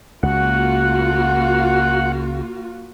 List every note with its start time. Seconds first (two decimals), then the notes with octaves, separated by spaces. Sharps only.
0.23 C#2 A#3 F4 F#4 F#5